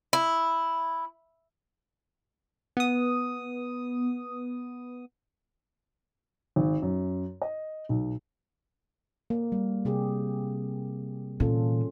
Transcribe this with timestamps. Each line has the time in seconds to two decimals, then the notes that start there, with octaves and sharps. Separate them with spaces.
0.13 E4
2.77 B3 D#6
6.56 G#1
6.82 F#2
7.42 D#5
7.89 B1
9.30 A#3
9.52 G3
9.85 C3 G4 G#4
11.40 A#2 E3 C#4 F4 A4